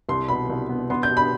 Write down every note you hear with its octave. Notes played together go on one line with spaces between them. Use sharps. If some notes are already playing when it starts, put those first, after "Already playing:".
C2 C6
B2 B5
C2
B3
B3 C6
G6
B2
B5